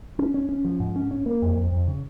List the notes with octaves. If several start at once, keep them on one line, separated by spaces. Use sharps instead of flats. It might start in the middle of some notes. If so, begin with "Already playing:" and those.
C#4
C#4
C#4
F3
G#2
C#4
C#4
A#3
F2
F2
F2
C#3